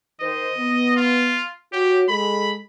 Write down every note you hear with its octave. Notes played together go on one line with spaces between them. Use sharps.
D#3 C5 D#5
B3
F4
F#4 G4 C#5
G#3 A4 B5